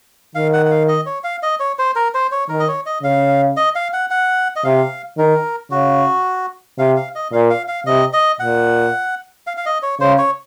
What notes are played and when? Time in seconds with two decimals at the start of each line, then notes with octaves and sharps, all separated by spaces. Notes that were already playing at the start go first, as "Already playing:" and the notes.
0.35 D#3 F5
0.53 F#5
0.66 F#5
0.71 F5
0.88 D#5
1.06 C#5
1.24 F5
1.43 D#5
1.60 C#5
1.79 C5
1.96 A#4
2.14 C5
2.32 C#5
2.49 D#3 A#4
2.60 D#5
2.68 C#5
2.86 D#5
3.03 C#3 F5
3.57 D#5
3.75 F5
3.93 F#5
4.10 F#5
4.56 D#5
4.64 C3 F5
5.18 D#3 A#4
5.71 C#3 F#4
6.78 C3 F5
6.96 F5
7.15 D#5
7.33 A#2 F5
7.50 F5
7.68 F5
7.87 C3 D#5
8.13 D#5
8.40 A#2 F#5
9.47 F5
9.57 F5
9.66 D#5
9.83 C#5
10.00 C#3 C5
10.18 C#5